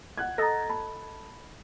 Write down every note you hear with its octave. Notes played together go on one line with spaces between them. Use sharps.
F#5 F#6 G#6
A4 D#5 A#5 A6 A#6
A5 B5